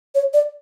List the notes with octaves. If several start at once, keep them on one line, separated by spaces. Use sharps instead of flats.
C#5
D5